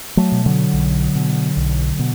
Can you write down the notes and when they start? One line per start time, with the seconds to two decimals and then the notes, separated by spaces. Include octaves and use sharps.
0.17 F#3 A3
0.32 B2
0.46 D3 F#3
0.74 B1
1.15 B2
1.57 B1
1.99 B2